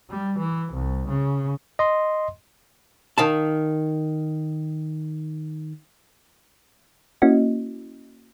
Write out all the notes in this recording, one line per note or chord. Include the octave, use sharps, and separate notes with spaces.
G3
E3
C2
C#3
D#5 C6
D#3 F5 A5
A#3 C#4 E4 F#4 D#5